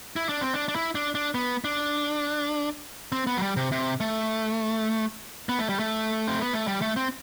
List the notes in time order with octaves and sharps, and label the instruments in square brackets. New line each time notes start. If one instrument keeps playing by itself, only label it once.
[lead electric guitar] E4
D4
C4
D4
D4
E4
D4
D4
B3
D4
C4
B3
F#3
G3
C3
C3
A3
B3
A3
G3
A3
C4
B3
A3
G3
A3
C4